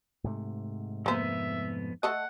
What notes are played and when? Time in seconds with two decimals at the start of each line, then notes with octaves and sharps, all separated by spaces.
0.24 G#2 C3 A3
1.06 F2 A#3 B3 C5 E5
2.03 A3 A4 D#5 F#5